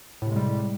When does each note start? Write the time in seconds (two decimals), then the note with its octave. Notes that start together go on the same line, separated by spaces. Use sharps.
0.22 A2
0.27 C3
0.32 G#3
0.36 G3